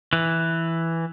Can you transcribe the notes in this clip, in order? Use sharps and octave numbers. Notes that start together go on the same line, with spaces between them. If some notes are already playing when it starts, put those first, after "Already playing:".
E3